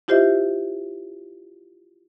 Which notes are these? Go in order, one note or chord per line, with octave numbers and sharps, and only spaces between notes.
E4 F4 G4 C5 D#5 E5